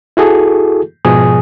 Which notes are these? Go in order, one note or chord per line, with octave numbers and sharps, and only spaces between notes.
E4 F#4 G#4 A4
G#2 B2 F3 G#4 G#5 D#6